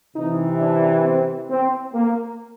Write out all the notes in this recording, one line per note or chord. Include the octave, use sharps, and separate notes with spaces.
C3 E3 D#4
D4
C4
C4
A#3